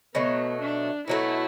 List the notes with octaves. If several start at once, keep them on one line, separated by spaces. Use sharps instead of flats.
B2 F#3 A3 B3
D4
B2 F#3 A3 E4